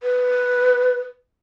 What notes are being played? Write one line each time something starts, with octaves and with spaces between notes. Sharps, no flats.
B4